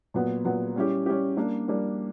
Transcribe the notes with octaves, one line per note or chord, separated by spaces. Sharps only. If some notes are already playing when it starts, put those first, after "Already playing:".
A#2 F#3 B3
A#2 F#3 B3
G3 C#4 E4 G4
G3 C#4 E4 G4
G3 A#3 D4 A#4
G3 A#3 D4 A#4